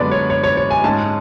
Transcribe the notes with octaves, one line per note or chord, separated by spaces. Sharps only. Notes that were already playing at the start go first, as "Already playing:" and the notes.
Already playing: F#2 D3 G#3 B3 D4 B4 D5
C#5
C#5
C#5
C#5
G#5
G#2 G#3 C#4 A5